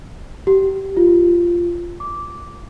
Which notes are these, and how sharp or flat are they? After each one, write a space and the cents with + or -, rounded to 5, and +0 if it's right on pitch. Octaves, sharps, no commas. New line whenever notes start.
G4 -25
F4 -10
D6 -10